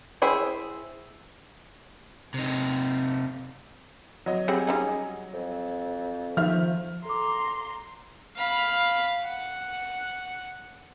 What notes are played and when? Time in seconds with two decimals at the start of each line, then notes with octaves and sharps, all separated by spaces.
0.22 E4 G#4 C5 E5 G5
2.34 C3 D#4
4.26 F#3 D#5
4.48 G3 C4 F#4 G#4
4.67 G3 C#4 D#4
5.33 F2
6.37 D#3 F3 E5 F6
7.05 A4 A#5 C6 D6
8.37 F5 B5
9.24 F#5